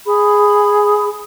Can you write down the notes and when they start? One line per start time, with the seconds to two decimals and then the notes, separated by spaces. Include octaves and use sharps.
0.06 G#4 B5